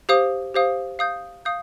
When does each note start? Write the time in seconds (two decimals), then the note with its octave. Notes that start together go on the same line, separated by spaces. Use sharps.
0.09 G4 C5 F5 D#6
0.54 G4 C5 F5 D#6
0.99 F5 D#6 G6
1.45 F5 D#6 G6